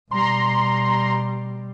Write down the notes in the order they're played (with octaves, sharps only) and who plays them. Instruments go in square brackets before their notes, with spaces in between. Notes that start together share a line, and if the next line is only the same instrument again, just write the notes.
[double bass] B2 G3 [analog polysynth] A#5 C6